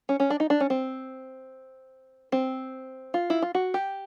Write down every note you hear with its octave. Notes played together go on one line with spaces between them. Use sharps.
C#4
C#4
D4
D#4
D4
C#4
C4
C4
F4
E4
F4
F#4
G4